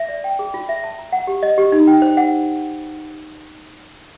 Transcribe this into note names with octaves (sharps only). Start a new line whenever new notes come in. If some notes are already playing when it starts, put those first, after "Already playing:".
Already playing: E5
D5
G5
G#4
F4
E5
A5
A#5
F#5
G4
D#5
G4
D#4
G5
C5
F#5